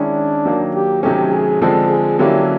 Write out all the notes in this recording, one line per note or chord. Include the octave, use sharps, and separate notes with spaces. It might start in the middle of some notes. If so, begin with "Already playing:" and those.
Already playing: D#3 G#3 C#4 D4 E4
D#3 F#3 A#3
G4
C3 D#3 F#3 A3 C#4 G4
G#4
D3 F3 G#3 C4 A4
G#4
D3 F#3 A#3 C#4 E4 G4